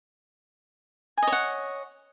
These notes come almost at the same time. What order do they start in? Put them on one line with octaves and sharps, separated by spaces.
G#5 D#5 C#5 F#5